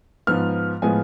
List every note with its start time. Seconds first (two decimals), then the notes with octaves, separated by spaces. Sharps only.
0.27 G#2 F3 B3 F6
0.82 A2 F3 G#3 B3 G#5